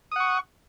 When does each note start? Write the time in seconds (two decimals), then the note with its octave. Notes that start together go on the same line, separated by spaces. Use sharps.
0.12 D#6
0.16 F#5
0.20 C#6